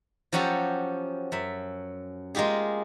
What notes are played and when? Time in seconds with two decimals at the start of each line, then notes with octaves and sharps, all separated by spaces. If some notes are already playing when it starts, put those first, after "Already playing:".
0.32 F3 F#3 C#4 F#4 G4 A4
1.32 F#2 E5
2.35 G#3 A#3 F4 G4 G#4